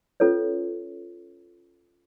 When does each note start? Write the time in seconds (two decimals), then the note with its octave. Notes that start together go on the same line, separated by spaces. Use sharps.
0.20 C#4 F4 A4 B4 C#5